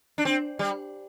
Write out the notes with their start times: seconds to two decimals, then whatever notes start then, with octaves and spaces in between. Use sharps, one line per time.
0.18 D4
0.25 C4
0.59 G3